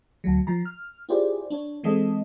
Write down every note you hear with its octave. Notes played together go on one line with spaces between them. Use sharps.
D2 F#3
F3 A#5
F6
E4 F4 G4 G#4 C5 D5
D4 C#5
E3 G#3 C4 A4 D#5